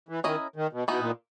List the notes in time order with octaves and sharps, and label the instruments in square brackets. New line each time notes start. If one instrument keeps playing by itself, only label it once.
[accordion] E3
[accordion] D#3 [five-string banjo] C#4 E4 A#4 D#5
[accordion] D#3
B2
[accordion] B2 [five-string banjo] E3 B3 D#4
[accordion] A#2